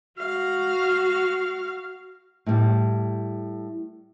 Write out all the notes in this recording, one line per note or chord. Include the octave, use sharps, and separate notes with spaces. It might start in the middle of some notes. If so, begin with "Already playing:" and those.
F#4 F5
A2 G3